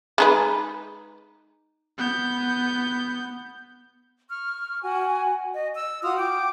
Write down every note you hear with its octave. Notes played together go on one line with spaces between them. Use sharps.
G#3 D#4 B4
B3 G6
C#6 F6
F#4 G#5
D#5
E6
F4 F#4 D#6 F6
G5 D6